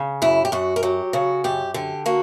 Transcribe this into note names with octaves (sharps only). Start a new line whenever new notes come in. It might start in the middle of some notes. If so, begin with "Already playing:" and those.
Already playing: C#3
F#2 E4
G4
F#2 F#4
A#4
F#3 G4
C#3 F#4
F#2 G4
D3 G4
A#3 F#4